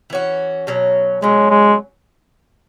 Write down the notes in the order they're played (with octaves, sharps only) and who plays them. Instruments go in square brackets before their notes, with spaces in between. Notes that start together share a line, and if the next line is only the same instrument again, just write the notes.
[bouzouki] E3 C#4 F#4
B2 F#3 C#4
[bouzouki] B2 F#3 C#4 [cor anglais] G#3
[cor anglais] G#3